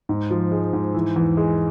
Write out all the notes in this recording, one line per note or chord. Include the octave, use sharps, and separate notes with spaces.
G#2
F3
G#3
G#2
E3
E2
G#3